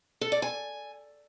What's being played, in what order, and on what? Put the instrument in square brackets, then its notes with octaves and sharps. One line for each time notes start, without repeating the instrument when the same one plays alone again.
[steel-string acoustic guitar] A4
D5
G#5